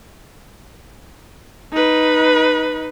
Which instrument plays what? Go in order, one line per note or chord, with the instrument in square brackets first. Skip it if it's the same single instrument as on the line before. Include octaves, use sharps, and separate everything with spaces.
[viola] D#4 B4